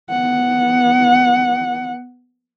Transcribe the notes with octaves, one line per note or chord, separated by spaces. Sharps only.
B3 F#5